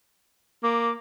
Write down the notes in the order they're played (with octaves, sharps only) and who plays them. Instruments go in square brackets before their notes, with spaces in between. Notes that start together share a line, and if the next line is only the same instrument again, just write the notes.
[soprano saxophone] A#3 [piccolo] D6